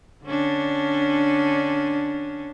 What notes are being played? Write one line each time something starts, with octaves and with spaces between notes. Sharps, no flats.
D3 C#4 D4